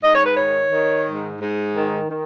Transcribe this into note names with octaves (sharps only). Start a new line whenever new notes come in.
G#2 D#5
C#5
B4
D#3 C#5
D#3
G#2
G#2
D#3
D#3